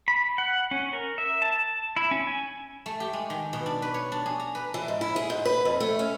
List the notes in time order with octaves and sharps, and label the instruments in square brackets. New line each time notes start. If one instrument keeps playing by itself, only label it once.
[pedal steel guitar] B5
F#5
C#4
A#4
E5
A5
E4
C#4
G#5
[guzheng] A3
G4
G#3
D#3
B2
D4
B4
C#5
D4
G#4
A#5
B4
[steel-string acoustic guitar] E3
G#2
E4
G#4
G#2
B4
F2
A3
C#4